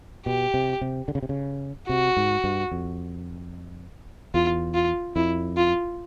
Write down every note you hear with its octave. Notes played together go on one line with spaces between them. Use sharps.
B2 G4
C3
C3
D3
C#3
C3
C#3
C3 F#4
G#2
G2
F2
E2 F4
F4
F2 E4
F4